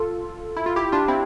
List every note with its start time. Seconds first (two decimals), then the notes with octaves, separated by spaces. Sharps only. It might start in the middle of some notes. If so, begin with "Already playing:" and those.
Already playing: F4 A4
0.57 E4
0.66 F4
0.76 E4 G4
0.92 D4 F4
1.08 C4 E4